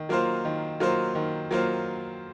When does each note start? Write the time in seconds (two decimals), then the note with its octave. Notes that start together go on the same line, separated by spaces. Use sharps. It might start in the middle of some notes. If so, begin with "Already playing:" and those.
Already playing: D#3
0.09 F#3 A#3 F4 C5
0.45 D#3
0.80 F#3 A#3 F4 C5
1.15 D#3
1.51 F#3 A#3 F4 C5